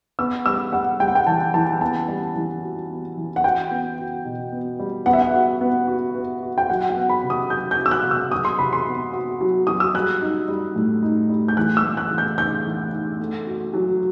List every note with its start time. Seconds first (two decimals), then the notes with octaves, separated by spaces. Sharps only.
0.19 B3 E6
0.46 G3 E6
0.72 G3 F#5
1.00 G3 G5
1.08 F#5
1.15 G5
1.27 E3 A5
1.54 E3 A5
1.81 B3 A5
2.08 G3
2.36 E3
2.62 F#4
2.90 B3
3.17 E3
3.36 F#5
3.44 F#4 G5
3.71 B3
3.98 F#4
4.25 B2
4.52 B3
4.80 G3
5.06 B3 F#5
5.13 E5
5.22 F#5
5.33 F#4
5.61 B3
5.87 F#4
6.15 B3
6.42 F#4
6.58 G5
6.69 F#3 F#5
6.89 F#5
6.96 B3
7.09 B5
7.23 C3
7.30 D#6
7.50 F#3 G6
7.71 G6
7.78 F#3
7.86 E6
7.91 F#6
8.05 C3
8.11 E6
8.32 F#3 D#6
8.45 C6
8.59 C3 B5
8.73 C6
8.86 B3
9.13 F#4
9.41 F#3
9.67 F#3 D#6
9.80 E6
9.94 G3 F#6
10.21 D#4
10.48 G3
10.76 A2
11.03 D#4
11.30 G3
11.48 G6
11.57 E3 F#6
11.77 E6
11.84 A2
11.97 F#6
12.11 E3
12.18 G6
12.38 D#4 G6
12.65 E3
12.93 D#4
13.19 A3
13.47 F#4
13.74 F#3